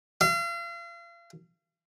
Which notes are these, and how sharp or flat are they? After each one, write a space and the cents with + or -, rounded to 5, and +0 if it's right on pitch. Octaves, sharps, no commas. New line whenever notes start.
F5 -40